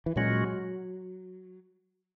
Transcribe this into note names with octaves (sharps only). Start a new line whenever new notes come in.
E3
A#2 F#3 G#3 C#4 F#4